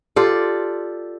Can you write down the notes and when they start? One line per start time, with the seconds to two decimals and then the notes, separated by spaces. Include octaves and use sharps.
0.16 F4 G4 A4 D5